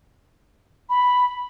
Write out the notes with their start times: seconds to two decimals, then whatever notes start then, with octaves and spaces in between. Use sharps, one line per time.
0.89 B5